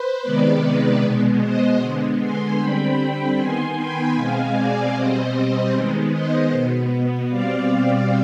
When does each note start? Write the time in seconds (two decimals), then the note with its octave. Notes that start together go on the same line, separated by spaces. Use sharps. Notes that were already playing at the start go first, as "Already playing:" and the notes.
Already playing: B4 C5
0.23 C3 D#3 G#3 B3 B4 D5
1.01 B2 G#3 B3
1.40 C5 D#5
1.81 D3 G#3 B3
2.19 G#5 C6
2.58 D3 G3 C4 G5 B5
2.97 G5 B5
3.37 D#3 B3 G#5 C6
3.76 G5 B5
4.15 B2 G#3 C4 F5 G#5
4.54 D5 F5
4.94 B2 G3 C4 C5 D#5
5.73 D#3 G#3 B3
6.12 C5 D#5
6.51 B2 B3
7.29 B2 G3 C4 D5 F5
7.68 D5 F5